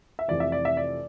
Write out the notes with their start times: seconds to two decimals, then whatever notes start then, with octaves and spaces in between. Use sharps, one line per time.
0.19 E5
0.28 F1 F2 C3 E3 D5
0.40 E5
0.52 D5
0.65 E5
0.77 D5